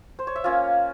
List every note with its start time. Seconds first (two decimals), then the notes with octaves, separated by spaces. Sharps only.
0.19 C5
0.27 C#5
0.36 E5
0.44 A#3 C#4 F4 F5